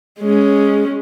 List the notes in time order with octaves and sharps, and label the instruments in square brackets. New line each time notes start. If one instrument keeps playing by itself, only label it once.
[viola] G#3 C#4